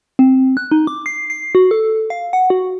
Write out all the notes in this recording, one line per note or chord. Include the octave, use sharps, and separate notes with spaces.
C4
F#6
D#4
D6
C7
C7
F#4
A4
F5
F#5
F#4